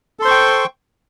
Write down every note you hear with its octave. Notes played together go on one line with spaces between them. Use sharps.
A4 C5 G5 C6 C#6